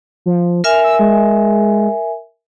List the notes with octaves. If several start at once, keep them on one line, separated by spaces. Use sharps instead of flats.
F3
A#4 E5 G#5 F6
E6
G#3